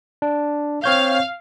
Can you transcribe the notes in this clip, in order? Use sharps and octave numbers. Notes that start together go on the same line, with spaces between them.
D4
C4 C#5 F5 G6